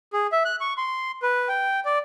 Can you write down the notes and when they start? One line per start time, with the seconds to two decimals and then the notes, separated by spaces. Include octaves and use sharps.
0.13 G#4
0.32 E5
0.45 F#6
0.61 C#6
0.78 C6
1.22 B4
1.49 G5
1.85 D5